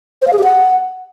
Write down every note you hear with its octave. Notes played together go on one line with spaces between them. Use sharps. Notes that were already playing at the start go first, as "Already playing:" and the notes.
C5
F5
G#4
G4
F#5